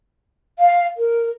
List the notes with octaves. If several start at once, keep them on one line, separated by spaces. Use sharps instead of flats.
F5
A#4